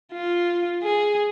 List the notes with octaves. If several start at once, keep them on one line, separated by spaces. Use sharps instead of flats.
F4
G#4